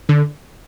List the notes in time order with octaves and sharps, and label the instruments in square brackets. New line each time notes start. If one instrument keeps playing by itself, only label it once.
[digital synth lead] D3